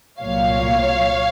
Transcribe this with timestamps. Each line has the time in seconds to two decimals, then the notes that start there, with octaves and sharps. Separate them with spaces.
0.21 C2 A#2 F#3 C#5 F5